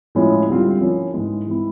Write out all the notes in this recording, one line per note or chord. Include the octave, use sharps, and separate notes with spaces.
A2 F3 G#3 C#4 E4
D3 G3 C4 F4
F3 A#3 C#4 E4
G#2 E3 G#3
E3 G#3 C4 E4